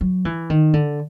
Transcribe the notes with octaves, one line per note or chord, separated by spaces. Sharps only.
F#3
E3
D#3
D3